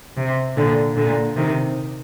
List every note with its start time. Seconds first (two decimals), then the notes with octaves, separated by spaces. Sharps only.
0.16 C3
0.56 A#2 D3
0.96 A#2 D3
1.36 C3 D#3